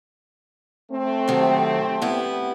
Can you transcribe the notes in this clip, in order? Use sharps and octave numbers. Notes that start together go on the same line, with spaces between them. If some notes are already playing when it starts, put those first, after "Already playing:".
A3 C4
C3 D#3 F#3
B3 E4 G4